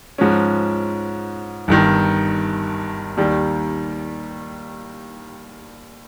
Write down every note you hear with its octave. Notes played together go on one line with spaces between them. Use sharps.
G#2 F3 G#3 C#4
G1 G2 D#3
D#2 D#3 G3